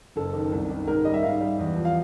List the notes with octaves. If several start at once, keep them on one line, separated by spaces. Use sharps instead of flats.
F#1 A4
D#3
C2
D#3
G#2 A#4
G3 D#5
E5
G#2 F5
G3
E2
F3
F5